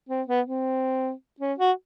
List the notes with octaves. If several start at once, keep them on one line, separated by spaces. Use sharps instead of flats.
C4
B3
C4
C#4
F#4